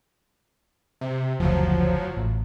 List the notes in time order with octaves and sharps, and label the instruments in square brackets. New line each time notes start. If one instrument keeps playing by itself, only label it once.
[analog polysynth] C3
[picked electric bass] F#1 D2 [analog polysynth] F3 F#3
[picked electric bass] A1